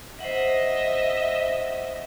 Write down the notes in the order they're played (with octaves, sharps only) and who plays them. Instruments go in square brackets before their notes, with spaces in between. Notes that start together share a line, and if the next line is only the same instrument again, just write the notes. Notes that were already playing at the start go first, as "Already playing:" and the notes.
[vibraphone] C5 F#5 [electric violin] D#5 E5